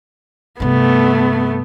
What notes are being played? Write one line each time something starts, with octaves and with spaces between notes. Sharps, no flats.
G2 C3 A3 B3